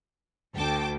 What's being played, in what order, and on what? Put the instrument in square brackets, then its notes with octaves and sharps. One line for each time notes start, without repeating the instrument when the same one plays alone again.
[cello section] D2 [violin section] G5 A5 D6